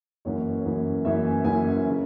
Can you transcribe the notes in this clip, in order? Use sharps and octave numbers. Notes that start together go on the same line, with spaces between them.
F#1 F#2 E3 C#5
F#1 F#2 E3
F#1 F#2 E3 E5
G#5
F#1 F#2 E3 G#5
C#3